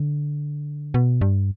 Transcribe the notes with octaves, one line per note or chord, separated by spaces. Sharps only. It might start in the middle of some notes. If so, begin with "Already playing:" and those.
Already playing: D3
B2
G2